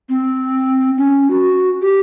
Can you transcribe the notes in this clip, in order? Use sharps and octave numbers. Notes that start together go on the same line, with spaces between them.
C4
C#4
F#4
G4